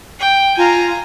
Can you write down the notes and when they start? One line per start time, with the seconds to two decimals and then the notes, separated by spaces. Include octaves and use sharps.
0.20 G5
0.57 F4 G#5 A#5